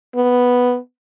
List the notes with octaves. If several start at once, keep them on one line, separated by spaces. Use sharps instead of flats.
B3